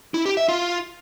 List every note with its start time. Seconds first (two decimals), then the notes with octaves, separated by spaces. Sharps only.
0.14 E4
0.26 G4
0.37 E5
0.49 F4